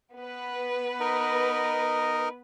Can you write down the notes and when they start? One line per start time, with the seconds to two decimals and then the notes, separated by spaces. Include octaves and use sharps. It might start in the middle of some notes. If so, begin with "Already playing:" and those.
0.15 B3 B4
1.00 D#4 A#4 D#5